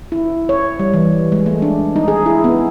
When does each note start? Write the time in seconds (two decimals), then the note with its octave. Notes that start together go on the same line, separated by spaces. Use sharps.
0.12 E4
0.49 C#5
0.79 G3
0.94 E3
1.32 G#3
1.46 A3
1.62 D4
1.96 D#4
2.08 G#4
2.26 E4
2.44 B3